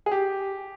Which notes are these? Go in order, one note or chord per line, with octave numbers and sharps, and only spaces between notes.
G#4
G4